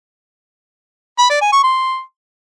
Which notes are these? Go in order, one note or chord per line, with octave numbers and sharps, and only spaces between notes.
B5
D5
G#5
C#6
C6